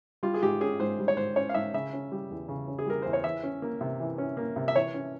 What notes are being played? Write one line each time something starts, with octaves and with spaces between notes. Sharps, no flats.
G3 F4
G#4
G#2 G4
C#4 G#4
G#2 C5
G3
C#5
G#2 C5
C#4 C#5
F5
G#2 E5
C#3 E5
C#4
G3
E2
C#3
C#4
G#4
G3 A#4
E2 C5
C#5
E3 E5
C#4
A#3
C3
E3
C#4
A#3
C3
E5
E3 C#5
C#4